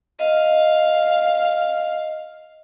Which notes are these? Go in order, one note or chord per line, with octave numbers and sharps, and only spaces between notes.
D#5 F5